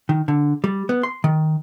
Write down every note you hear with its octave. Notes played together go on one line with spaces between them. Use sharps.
D#3
D3
G3
B3
C6
D#3